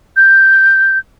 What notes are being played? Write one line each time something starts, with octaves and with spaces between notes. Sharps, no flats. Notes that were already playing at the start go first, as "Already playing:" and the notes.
G6